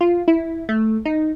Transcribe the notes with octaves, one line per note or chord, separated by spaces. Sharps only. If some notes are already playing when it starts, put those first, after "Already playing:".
F4
E4
A3
D#4